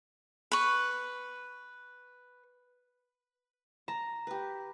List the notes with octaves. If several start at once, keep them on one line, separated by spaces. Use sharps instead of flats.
B4 C#6
A5 A#5
G4 B4